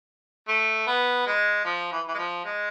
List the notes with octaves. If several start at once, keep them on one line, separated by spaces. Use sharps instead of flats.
A3
B3
G#3
F3
E3
E3
G#3
F3
G#3